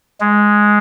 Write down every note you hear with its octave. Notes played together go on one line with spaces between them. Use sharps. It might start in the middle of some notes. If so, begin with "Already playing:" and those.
G#3